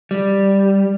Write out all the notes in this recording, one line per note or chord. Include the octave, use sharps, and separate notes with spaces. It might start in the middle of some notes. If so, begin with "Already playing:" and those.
G3